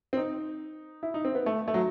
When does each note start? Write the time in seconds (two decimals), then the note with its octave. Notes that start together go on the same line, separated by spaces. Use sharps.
0.13 C4
0.17 D#4
1.03 E4
1.14 D#4
1.25 C4
1.35 B3
1.46 A3
1.68 A3
1.74 F#3